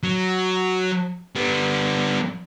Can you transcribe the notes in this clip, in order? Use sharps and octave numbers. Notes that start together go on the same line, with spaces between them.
F#3
G3 B3